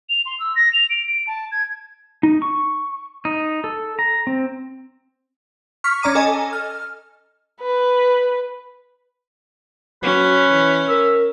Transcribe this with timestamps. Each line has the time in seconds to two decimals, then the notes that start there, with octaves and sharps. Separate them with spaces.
0.09 F7
0.26 C6
0.40 E6
0.56 A#6
0.73 F7
0.90 D7
1.08 D7
1.27 A5
1.52 G#6
2.23 D#4
2.42 C#6
3.25 D#4
3.64 A4
3.99 A#5
4.27 C4
5.84 C#6 F6 B6
6.02 C#4 D5 A#5 D6 D#7
6.15 A4 D#5 G#5
6.53 F6
7.61 B4
10.03 F#3 C#4 B4
10.51 E3
10.88 A#4 E5